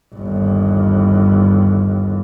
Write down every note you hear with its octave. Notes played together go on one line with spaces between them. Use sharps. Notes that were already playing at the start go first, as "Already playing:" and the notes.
G1 D#2